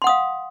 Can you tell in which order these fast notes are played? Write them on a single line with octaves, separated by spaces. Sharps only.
C6 F#5 D#6 F5